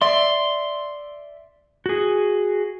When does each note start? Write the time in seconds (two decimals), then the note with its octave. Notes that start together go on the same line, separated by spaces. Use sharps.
0.02 D5 E5 C6
1.86 F#4 G#4